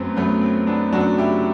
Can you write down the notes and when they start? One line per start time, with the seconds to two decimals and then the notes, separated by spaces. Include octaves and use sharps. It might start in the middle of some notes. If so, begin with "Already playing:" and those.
Already playing: F#2 F#3 A3 B3 C4
0.16 F#2 F#3 A3 B3
0.42 C4
0.67 B3 D4
0.93 F#2 F#3 A3 D4 F#4
1.18 E4 G4